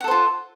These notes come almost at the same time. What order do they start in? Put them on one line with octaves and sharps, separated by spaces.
F#5 A4 C5 F4